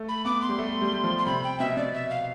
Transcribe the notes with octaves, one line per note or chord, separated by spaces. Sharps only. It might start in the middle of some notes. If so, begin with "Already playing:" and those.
Already playing: A3
B5
B3 D6
C6
G3
A3
G3
G3
F3
C6
C3 B5
G5
B2 E5
B2 D5
E5
F5